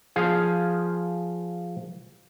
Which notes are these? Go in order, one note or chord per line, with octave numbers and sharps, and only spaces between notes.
F3 G#4 F5